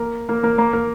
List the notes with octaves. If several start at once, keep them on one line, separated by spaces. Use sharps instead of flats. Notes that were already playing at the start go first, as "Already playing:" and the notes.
Already playing: A#3 A#4
A#3 A#4
A#3 A#4
A#3 A#4
A#3 A#4